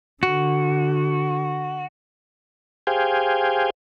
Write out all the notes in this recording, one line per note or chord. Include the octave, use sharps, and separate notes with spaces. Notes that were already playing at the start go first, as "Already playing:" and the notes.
D3 F#4
G4 G#4 C5 F5 G5 G#5